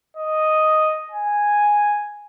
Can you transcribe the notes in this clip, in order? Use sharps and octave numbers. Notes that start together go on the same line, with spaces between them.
D#5
G#5